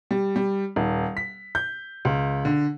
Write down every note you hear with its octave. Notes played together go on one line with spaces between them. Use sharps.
G3
G3
D#1
B6
G6
C#2
D3